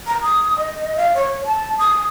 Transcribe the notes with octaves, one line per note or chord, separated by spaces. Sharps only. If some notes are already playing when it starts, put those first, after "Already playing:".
A#5
D#6
D#5
F5
C#5
A5
D#6